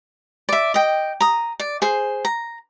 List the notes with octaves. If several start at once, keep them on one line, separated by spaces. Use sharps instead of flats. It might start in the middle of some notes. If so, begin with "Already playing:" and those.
D5 E5
D#5 G5
A#5 D#6
D5
G#4 C5
A#5